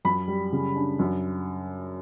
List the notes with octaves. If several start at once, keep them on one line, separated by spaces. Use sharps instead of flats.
F#2 B5
G3
C#3
D4
F#2